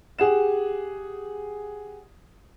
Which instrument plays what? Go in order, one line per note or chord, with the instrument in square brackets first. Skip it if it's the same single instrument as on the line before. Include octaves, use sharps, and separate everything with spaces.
[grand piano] G4 G#4 F#5 E7